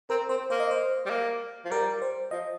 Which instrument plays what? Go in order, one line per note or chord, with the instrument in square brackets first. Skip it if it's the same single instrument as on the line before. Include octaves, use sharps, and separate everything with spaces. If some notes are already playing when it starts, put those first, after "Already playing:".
[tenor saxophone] C4 [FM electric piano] A#4
[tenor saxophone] C4 [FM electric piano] C5
[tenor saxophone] A#3 [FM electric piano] C5
[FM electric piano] D#5
C5
[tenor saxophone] G3
A#3
F3
[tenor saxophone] G3 [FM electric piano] A#4
[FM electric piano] C5
[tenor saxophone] F3 [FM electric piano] D#5